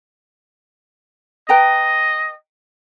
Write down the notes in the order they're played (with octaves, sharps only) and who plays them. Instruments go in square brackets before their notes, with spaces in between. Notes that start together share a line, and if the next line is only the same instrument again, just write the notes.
[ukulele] B4 G5 A#5 [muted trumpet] D#5